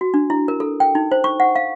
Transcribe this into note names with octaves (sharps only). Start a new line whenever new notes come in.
F#4
D4
E4
A#4
A4
G5
D#4
C5
C#6
F#5
F5